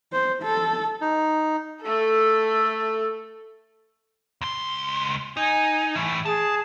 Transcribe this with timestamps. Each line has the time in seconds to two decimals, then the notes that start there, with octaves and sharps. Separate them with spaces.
0.13 C5
0.43 A4
1.01 D#4
1.81 A3 A4
4.41 C#2 C6
5.37 D#4 G#5
5.95 A2 E3
6.26 G#4 A5